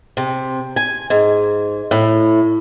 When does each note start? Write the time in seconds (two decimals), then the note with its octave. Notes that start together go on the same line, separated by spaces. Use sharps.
0.17 C3
0.76 G#5
1.10 G#2
1.91 A2